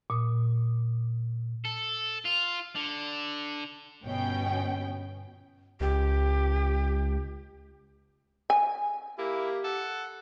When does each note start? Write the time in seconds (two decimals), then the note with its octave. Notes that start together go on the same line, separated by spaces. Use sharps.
0.10 A#2 D#6
1.65 A4
2.25 F4
2.75 D3
4.03 G1 B2 C#4 G5
5.80 C#2 G4
8.50 G#5
9.19 A#3 E4 G4
9.64 A4 F#5